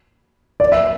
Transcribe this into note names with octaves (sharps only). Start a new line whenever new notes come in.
D5
E5